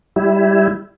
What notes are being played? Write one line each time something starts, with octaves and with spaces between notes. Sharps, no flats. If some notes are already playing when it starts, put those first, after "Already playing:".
G3 E4